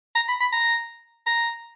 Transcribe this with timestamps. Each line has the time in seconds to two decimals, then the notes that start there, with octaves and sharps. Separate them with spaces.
0.15 A#5
0.28 B5
0.41 B5
0.52 A#5
1.27 A#5